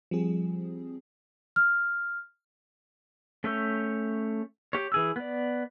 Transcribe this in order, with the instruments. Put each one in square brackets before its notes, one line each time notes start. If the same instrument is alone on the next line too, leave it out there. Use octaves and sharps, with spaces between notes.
[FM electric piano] F3 G3 C4 G#4
[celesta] F6
[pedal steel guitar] A3 C#4 C#5 E5 G5
G4 C#5
E3 G#4 E6
B3 D5